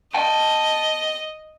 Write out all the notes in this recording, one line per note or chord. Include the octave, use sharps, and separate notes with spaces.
D#5 G5 A5